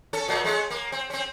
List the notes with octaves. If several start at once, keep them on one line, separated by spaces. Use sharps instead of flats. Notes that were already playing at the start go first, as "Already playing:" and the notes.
C#4 A4
A#2 F#3 A3
G#3 A3 C#4
A#3
C4
C4 C#4